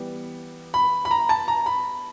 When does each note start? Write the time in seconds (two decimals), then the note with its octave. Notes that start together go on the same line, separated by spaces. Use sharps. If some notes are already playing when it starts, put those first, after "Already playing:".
Already playing: E3 G3 B3
0.74 B5
1.05 B5
1.11 A#5
1.29 A5
1.48 A#5
1.66 B5